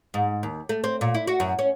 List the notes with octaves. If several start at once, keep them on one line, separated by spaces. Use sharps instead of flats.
G#2
D#2
A3
C4
A#2
E4
F#4
F#2
C#4